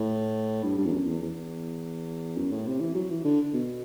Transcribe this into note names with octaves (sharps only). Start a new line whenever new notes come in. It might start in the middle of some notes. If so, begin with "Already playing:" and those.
Already playing: A2
G2
G2
E2
F#2
E2
E2
F#2
A2
C3
E3
F#3
E3
D3
B2